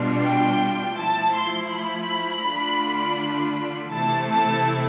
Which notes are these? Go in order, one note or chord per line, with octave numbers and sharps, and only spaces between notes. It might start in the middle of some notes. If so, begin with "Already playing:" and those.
Already playing: B2 G3 D4 F4
G5
F3 A3 E4 A5
C6
B5
D3 A3 D4 F4
C3 E3 A3 E4 A5
A5